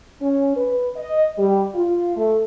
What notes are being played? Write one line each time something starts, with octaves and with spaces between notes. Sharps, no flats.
C#4
B4
D#5
G3
F4
A3